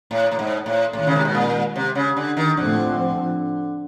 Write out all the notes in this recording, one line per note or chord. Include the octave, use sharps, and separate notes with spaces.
A2
A2
G#2
A2
A2 D#3 G#3 C#4
C#3
C3
B2
A#2
C3
C#3
D3
D#3
A2 D3 F3 A3 C4